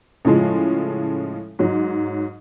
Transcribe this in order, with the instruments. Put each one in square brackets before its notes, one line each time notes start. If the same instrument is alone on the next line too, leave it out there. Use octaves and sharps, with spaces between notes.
[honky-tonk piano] A2 C#3 F3 G#3
G#2 F#3